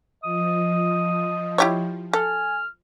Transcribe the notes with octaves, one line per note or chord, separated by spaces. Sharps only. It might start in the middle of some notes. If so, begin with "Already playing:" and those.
F3 D#5 D#6
E4 G4 C#5
A4 G#5 F6